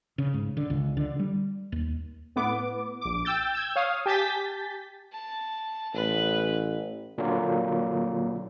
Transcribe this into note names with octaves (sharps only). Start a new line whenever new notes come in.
C#3
G#2
D3
C#2
D3
G3
D#2
A2 B3 D6
A#1 D6
G5 E6 G6 A6
E6 G6 G#6
C#5 F5 D#6
G4 G#5 A5 G6 A6 B6
A5
A1 B4
A#2 D3 F#3 A#3